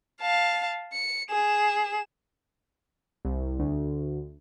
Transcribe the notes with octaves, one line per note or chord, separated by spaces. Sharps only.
F5 A5
C#7
G#4 E7
C2
D2